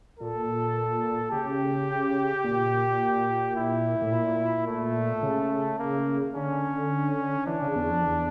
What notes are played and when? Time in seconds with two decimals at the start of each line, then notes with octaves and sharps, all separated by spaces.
0.19 A#2 A4
1.32 C#3 G4
2.44 A#2
3.56 E4
4.02 A2
4.12 A#2
4.67 A3
5.23 C#3
5.79 A#3
6.35 D3 C#4
7.47 E3 D4
7.61 C#3
7.76 E2
7.90 F2
8.03 E2